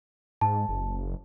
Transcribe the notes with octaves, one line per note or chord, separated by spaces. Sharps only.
G#2 A5
F#1